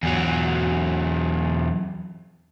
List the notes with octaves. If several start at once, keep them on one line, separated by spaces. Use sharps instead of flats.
E2 F#3